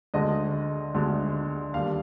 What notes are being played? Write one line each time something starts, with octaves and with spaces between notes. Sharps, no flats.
D2 D3 G#3 D#5
D2 D3 G#3
D#2 D3 G3 F5